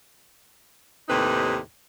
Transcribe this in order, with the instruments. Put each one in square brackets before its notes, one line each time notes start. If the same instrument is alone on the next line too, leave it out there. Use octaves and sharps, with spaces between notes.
[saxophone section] D#2 A2 C3 D#4 B4